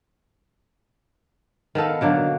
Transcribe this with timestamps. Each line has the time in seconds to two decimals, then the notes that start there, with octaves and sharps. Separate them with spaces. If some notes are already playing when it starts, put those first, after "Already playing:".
1.75 D#3 B3 A4 F5
2.01 B2 D3 F#3 A#3